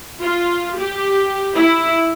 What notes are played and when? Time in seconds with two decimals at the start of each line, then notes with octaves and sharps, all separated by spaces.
0.21 F4
0.79 G4
1.54 E4